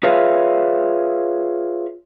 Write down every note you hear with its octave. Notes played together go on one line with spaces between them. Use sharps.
F4 G#4 B4 C#5 E5 F5